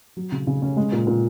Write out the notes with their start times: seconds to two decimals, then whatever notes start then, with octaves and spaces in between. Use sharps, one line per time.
0.17 F#3
0.32 C#3
0.47 C#3
0.62 C#4
0.77 G#3
0.92 A#2
1.07 A#2